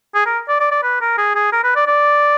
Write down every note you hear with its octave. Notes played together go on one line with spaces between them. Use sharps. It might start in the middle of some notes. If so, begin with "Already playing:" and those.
G#4
A#4
D5
D5
D5
B4
A#4
G#4
G#4
A#4
B4
D5
D5